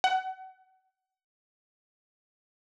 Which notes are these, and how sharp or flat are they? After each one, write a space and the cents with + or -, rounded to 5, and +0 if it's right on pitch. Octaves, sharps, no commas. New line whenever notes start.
F#5 +30